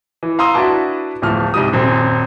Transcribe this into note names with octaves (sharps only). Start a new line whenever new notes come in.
E3
F5 A#5 C6 D#6 E6
D4 E4 F#4 B4 A5 D6
D1 E2 F3 A3 F6
C2 G#2 G3 D#6
D#1 F#2 C4